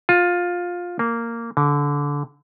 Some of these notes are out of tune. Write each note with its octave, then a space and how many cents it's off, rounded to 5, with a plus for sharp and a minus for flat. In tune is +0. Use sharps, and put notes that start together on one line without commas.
F4 +15
A#3 -10
D3 -25